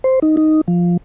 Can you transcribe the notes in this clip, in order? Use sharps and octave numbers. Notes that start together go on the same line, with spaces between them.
C5
D#4
D#4
F3